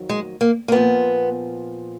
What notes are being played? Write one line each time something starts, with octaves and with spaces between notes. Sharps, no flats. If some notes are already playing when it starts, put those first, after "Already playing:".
Already playing: F2 D#3 F#3
G#3
A#3
A#3
A#2 F3 B3